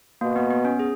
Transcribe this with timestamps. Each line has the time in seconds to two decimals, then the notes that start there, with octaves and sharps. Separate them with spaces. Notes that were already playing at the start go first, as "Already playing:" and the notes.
0.21 B2 A#3
0.36 B3
0.50 B3
0.65 C#4
0.79 G#4